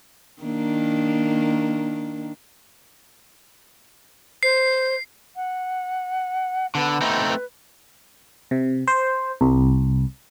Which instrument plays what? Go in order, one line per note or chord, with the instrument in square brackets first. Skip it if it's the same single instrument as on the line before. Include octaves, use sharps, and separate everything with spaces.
[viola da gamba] D#3 A#3 D4
[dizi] C5 [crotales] C7
[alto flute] F#5
[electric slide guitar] D3 [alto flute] B3
[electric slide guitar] A3 C4 D#4
[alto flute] B4
[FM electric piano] C3
C5
C2